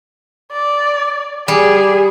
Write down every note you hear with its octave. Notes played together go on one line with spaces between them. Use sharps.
D5
G3 G#4